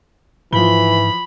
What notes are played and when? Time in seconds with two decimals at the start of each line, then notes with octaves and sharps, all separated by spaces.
0.53 G#2 E3 F3 B5 G7